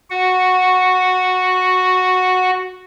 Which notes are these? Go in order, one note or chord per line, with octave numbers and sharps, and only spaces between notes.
F#4 F#5